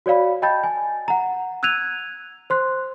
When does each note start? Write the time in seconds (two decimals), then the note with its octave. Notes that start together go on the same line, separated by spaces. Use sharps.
0.06 F#4 C#5 D5 F5 B5
0.42 D#5 G5 A5 B5 G6 A6
0.64 G#5
1.08 F#5 A#5
1.63 E6 F#6 G#6 D#7 F7
2.50 C5 C6 F#6